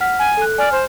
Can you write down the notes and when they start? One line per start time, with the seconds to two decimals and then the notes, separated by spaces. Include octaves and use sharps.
0.01 F#5 F6 B6
0.19 G#5
0.37 A4 F#6
0.58 D5 G#5 F6
0.72 C5